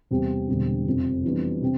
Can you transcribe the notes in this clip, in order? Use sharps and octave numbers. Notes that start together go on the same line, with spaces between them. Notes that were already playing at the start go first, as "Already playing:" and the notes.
E2 C3 G3 C4 G4
E1 E2 D3 G3 C4
F1 F2 C3
F2 E3 G3 B3 D4
C3 C4